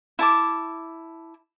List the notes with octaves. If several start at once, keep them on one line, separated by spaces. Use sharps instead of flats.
E4 A5 D6